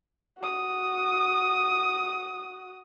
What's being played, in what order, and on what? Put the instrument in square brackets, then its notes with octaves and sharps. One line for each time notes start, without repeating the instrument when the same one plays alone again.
[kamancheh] F#4 D#6